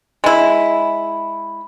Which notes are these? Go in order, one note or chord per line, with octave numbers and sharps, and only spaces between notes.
G#3 E4